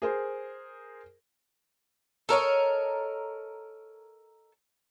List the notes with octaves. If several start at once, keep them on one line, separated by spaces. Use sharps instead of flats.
G#4 A#4 C5
A4 A#4 C#5 D#5